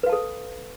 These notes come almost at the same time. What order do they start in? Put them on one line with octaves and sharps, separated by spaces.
B4 F5 A5 A4